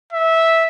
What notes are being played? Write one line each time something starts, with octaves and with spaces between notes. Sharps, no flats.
E5